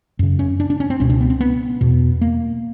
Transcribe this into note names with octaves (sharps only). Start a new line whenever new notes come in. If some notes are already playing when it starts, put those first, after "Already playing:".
F#2 C#3
C#4
D4
D4
C#4
C4
C#2 B2 C#4
D4
B3
C4
B3
E2 B2
A#3